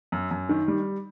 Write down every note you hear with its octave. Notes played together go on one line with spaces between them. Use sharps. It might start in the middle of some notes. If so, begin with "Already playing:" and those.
F#2
F#2
D#3
G3